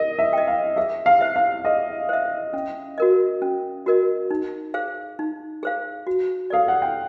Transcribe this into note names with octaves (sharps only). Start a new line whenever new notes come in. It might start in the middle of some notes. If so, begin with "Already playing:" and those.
Already playing: A#4 D#5
E5
D#5 G5
F5
G#4 E5
F5
C5 E5
F5
G#4 D#5
C5 E5
C#4
F#4 A#4 D#5
C#4
F#4 A#4 D#5
D#4
G#4 C5 F5
D#4
G#4 C5 F5
F#4
A4 D5 F5
F#5
G5